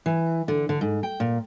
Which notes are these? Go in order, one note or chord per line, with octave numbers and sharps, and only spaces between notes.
E3
D3
D3
G#2
G5
A#2